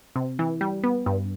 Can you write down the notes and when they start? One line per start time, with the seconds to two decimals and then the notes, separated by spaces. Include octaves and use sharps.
0.16 C3
0.39 E3
0.61 G3
0.84 B3
1.06 G2